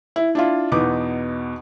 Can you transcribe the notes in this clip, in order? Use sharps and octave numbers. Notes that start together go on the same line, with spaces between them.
E4
D4 E4 F4
E2 B2 B3 D#4 D6